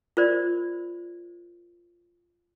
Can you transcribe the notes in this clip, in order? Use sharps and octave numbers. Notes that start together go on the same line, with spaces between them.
F4 A#4 C5 D5